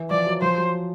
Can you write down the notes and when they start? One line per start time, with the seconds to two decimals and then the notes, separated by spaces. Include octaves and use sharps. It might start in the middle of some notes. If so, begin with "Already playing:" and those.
Already playing: E3
0.10 F3 D5
0.27 F#3
0.42 F3 C5
0.58 F#3